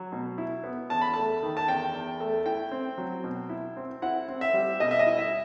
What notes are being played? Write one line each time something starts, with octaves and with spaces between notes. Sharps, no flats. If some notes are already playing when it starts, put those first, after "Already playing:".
Already playing: F#3
B2
E4
B3
E2 A5
B5
A3 A5
D#3
A5
E2 G5
E2
A3
E4 G5
C4
F#3
B2
E4
C4
E4 F#5
C4
E5
G3
B2 D#5
E5
D#5
E4
E5